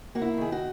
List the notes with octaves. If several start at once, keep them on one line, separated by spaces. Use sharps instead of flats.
A#3 F#4
E4
D#3 G#4
F#4